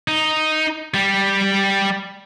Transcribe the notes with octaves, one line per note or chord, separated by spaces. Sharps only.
D#4
G3